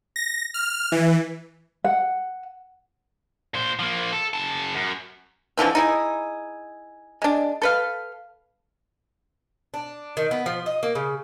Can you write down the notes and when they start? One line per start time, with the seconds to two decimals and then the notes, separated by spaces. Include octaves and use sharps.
0.16 A#6
0.54 F6
0.92 E3
1.84 F#5
3.54 A#2 C5
3.79 F3 A#3
4.13 A4
4.34 C#3 A5
4.75 F#2
5.57 D3 E3 F3 C4
5.75 D#4 E4 G#4
7.22 G#3 D4
7.62 A4 B4 F5
9.74 D4
10.17 D#3
10.31 B3
10.46 F3
10.66 D#5
10.83 A#3
10.95 C#3